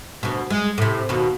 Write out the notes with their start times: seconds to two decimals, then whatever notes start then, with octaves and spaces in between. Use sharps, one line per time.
0.23 D2 B2
0.50 G#3
0.78 A2 C3
1.09 D#2 B2